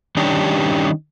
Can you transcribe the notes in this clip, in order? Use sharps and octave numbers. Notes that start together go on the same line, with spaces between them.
D#3 G3 C#4 D4 G4